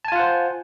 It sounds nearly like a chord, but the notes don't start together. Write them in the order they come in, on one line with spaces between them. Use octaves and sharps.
A5 G#5 F4 F#5 C5